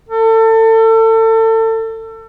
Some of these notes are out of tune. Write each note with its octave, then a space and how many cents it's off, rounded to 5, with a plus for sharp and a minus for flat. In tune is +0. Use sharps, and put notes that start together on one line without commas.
A4 +30